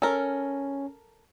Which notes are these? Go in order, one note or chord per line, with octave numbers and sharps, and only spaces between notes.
C#4 A4 A#4